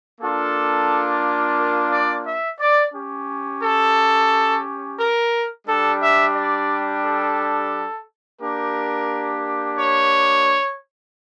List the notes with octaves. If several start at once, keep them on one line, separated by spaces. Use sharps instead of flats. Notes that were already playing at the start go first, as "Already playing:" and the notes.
A#3 D4 F4 A4
A#4
D5
E5
D5
C#4 G4
A4
A#4
G3 D4 G4 A4
E5
D5
A4
A#3 D4 G4 A#4
C#5